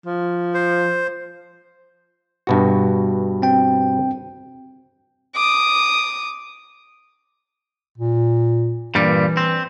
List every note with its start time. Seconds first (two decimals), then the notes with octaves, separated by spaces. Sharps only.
0.06 F3
0.54 C5
2.47 G2 B2 F#4
3.42 C4 G5
5.36 D6 D#6
7.98 A#2
8.95 G2 A#2 E3 G3
9.37 C4